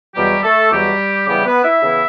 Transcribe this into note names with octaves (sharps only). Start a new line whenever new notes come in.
E2 B2 F#3 G3 G4
A3 A4
E2 B2 F#3 G3 G4
C#3 E3 G3 B3 E4 G4
B3 B4
E4 E5
C#3 E3 B3 E4